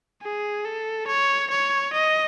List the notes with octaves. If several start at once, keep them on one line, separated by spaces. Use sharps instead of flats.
G#4
A4
C#5
C#5
D#5